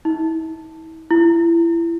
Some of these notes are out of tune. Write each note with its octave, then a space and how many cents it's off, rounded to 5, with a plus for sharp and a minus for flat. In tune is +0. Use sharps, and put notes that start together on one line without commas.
E4 -40
E4 +30